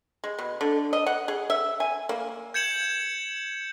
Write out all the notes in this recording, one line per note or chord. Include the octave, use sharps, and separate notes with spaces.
G#3
B2
D3
D#5
F#5
G#4
E5
G#5
A#3
G6 G#6 C#7 E7 F#7